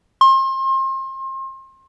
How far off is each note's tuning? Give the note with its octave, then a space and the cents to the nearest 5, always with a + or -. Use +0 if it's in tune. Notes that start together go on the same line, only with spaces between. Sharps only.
C6 +35